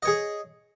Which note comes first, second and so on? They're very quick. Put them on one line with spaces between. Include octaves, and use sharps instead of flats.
D#5 C#5 G#4